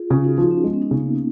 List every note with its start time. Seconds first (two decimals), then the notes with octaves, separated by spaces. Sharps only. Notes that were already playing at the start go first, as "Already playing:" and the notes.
Already playing: F4 G#4
0.10 C#3 F4 G#4
0.24 D#4 F#4
0.37 F3 D#4
0.51 C#4
0.64 G#3 B3
0.73 C#4
0.82 D#4
0.91 C#3
1.00 A#3